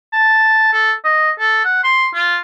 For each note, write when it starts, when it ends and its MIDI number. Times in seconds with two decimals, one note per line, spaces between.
0.13 0.69 81
0.73 0.92 69
1.04 1.31 75
1.39 1.61 69
1.64 1.80 78
1.84 2.07 84
2.14 2.37 65